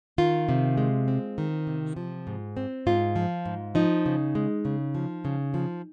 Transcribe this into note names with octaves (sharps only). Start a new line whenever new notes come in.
D#3 F4
C3
G#3
C4
D#3
C3
F3
G#2
C4
G#2 F4
F3
G#2
F3 D#4
C#3
G#3
C#3
F3
C#3
F3